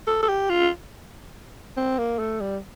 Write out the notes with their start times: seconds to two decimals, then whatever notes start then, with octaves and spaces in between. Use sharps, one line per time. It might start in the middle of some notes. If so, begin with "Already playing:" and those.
0.07 A4
0.23 A4
0.28 G4
0.50 F4
1.77 C4
1.98 A#3
2.19 A3
2.41 G3